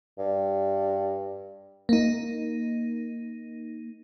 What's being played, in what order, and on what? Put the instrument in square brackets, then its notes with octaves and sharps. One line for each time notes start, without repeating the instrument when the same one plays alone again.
[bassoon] G2
[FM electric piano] A#3 D#4